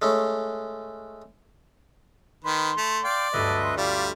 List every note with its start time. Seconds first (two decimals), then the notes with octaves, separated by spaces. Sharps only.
0.02 G#3 A3 C#4
2.44 D#3 B4 C6
2.77 A3
3.04 D5 F5 G5
3.33 G1 D2 G2 B4 D#5 E5
3.61 F#5 C6
3.77 G3 F4 D5 E5 F5